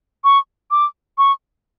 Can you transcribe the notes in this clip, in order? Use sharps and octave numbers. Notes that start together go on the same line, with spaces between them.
C#6
D6
C#6